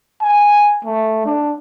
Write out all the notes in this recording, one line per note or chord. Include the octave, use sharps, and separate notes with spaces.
G#5
A3
D4